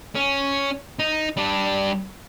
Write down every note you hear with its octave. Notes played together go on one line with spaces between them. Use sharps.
C#4
D#4
G3 D4